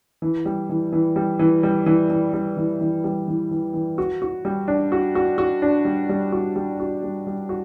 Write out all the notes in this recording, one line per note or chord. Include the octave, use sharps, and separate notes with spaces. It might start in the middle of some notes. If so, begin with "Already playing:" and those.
E3
G3
E3
E3
G3
E3
G3
E3
E3
G3
E3
E3
G3
E3
E3
E3
F#4
F#4
G3
D4
F#4
F#4
F#4
D4
G3
G3
F#4
G3
F#4
G3
G3
F#4